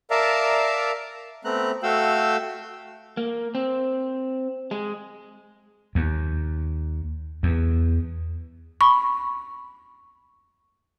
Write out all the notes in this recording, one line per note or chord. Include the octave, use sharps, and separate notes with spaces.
A#4 D5 E5 F5 A5 A#5
A3 B3 C4 A#5 F#6
A3 F#4 F5 G5 E6
A#3
C4
G#3
D#2
E2
B5 C#6